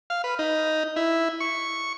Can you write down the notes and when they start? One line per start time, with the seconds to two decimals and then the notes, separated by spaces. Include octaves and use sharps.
0.10 F5
0.24 B4
0.39 D#4
0.96 E4
1.40 C#6